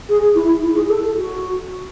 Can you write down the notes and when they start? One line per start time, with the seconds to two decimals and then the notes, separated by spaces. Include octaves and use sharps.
0.09 G#4
0.35 E4
0.62 E4
0.75 G#4
0.89 A4
1.16 F#4